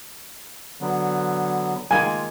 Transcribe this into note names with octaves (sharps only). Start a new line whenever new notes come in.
D3 F#3 B3
D#3 G#3 A#3 F4 G#5